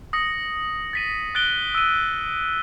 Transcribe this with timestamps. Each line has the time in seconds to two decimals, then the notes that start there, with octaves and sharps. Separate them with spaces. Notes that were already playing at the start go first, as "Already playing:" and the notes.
0.13 D#6 A#6 C#7
0.93 A6 B6 D#7
1.35 F#6 A6 D7 G7
1.75 E6 D#7